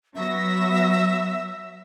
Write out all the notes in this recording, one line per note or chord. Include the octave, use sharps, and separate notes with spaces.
F#3 B3 E5 A#6